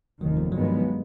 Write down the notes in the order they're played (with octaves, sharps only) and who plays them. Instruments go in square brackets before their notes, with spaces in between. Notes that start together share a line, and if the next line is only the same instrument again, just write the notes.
[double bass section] F1 D#2 D#3 [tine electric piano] F#3
[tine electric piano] F3
[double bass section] G2 D#3 G#3 B3 [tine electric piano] F#3
[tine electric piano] F3
F#3